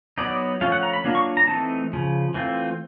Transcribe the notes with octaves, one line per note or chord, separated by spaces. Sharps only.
F#3 B3 D#4 D5
F3 A3 C#4 F4 F5
F#5
A#5
B5
F#3 A#3 D4 F4
C#6
A#5
E3 A3 C4 D#4 A5
C#3 F3
E3 A3 C4 F4